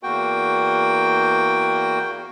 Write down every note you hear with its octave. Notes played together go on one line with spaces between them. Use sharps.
E2 A#3 F#4 G5